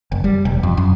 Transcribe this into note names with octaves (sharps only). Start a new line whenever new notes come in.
F#1
G3
E1
F2
F#2